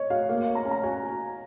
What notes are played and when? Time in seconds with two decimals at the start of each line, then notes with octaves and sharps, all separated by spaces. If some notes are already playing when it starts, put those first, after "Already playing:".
Already playing: C#5 D#5
0.10 F#4 F5
0.29 A#3 F5
0.47 C#5
0.55 A#5
0.65 C#4
0.71 A#5
0.83 F#4 G#5